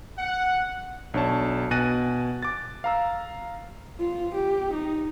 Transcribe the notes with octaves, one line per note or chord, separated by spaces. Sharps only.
F#5
B1 D4 C#5 A5
B2 G#5 F#6 A6 A#6 D#7
D6 A6
F5 A#5 E6
F4
G4
D#4